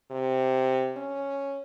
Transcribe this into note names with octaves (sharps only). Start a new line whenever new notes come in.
C3
C#4